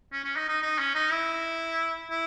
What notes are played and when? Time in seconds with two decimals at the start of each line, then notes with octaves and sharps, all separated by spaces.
0.12 C#4
0.24 C#4
0.36 D#4
0.48 D#4
0.62 D#4
0.78 C#4
0.95 D#4
1.11 E4
2.10 E4